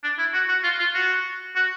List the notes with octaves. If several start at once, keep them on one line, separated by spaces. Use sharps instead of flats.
D4
E4
F#4
F#4
F4
F4
F#4
F#4